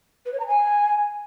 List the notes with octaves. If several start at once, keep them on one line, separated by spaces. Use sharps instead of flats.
B4
C#5
A#5
G#5